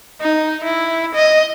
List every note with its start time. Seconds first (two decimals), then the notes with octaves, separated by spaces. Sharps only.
0.22 D#4
0.64 E4
1.15 D#5